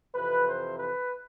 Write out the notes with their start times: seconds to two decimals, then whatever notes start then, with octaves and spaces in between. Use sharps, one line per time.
0.14 F2 C3 E3 B4
0.47 C5
0.78 B4